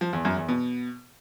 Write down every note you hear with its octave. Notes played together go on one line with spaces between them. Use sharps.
F3
E2
F#2
E2
B2